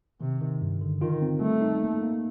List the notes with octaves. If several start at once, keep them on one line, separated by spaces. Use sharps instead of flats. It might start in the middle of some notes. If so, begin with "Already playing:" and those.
C3 D#3
D#3
G2
D3
D#3 F4
C4
G3 A3
D#4
A#3
A#3